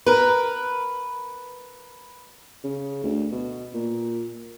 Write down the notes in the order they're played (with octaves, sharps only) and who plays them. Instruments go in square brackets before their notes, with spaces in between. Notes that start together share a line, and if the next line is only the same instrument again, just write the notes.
[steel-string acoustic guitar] A#4 B4
[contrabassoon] C#3
D2
B2
A#2